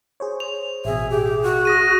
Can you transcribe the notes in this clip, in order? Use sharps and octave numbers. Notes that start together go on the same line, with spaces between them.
G#4 C5 C#5
F7
A1 B2 G#4 E5
G4 G#4
F#4
G#4 D#6 A#6 D#7